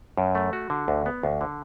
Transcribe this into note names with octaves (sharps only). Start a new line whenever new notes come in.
F#2
A3
F#4
D3
D2
B3
D2
D3